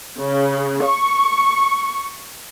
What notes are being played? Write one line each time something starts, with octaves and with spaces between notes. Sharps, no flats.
C#3
C#6